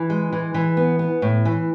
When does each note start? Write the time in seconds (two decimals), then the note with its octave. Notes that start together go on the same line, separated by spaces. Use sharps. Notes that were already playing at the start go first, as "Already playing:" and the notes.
Already playing: E3
0.10 G#3
0.32 E3
0.54 E3
0.77 B3
0.99 B3
1.22 A2
1.45 E3